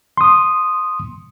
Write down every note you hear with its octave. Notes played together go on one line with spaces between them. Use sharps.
C6 D#6